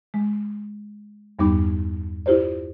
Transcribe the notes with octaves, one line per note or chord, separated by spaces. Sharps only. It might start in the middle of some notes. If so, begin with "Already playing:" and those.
G#3
E2 G2 G3 B3 D#4 D6
E4 F4 G4 C5 D5